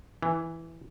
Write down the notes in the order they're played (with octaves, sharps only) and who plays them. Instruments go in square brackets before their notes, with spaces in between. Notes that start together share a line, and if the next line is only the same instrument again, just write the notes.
[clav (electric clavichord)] E3